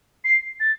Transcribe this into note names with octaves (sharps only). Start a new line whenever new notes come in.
C7
A6